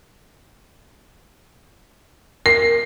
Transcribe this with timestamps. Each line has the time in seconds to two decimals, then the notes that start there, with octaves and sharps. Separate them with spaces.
2.46 A#4 C7